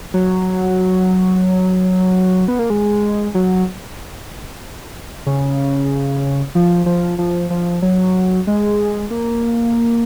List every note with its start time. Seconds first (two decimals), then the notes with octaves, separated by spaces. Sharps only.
0.14 F#3
2.48 B3
2.59 A#3
2.70 G#3
3.35 F#3
5.26 C#3
6.55 F3
6.86 F3
7.18 F3
7.50 F3
7.82 F#3
8.47 G#3
9.11 A#3